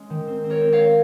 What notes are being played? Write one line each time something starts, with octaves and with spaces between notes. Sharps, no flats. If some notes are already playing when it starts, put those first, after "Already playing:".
Already playing: G#3 C#4
D#3
C4
C4
A#4 C#5
C4
C#5 F5
C4